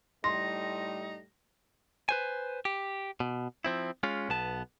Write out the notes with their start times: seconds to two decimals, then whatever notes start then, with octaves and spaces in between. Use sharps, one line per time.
0.24 A2 G3 A3 D#4 C6 A#6
2.09 B4 C5 G#5
2.65 G4
3.20 B2
3.64 F3 C4 E4
4.03 G#3 C#4 F4
4.29 B1 B3 A5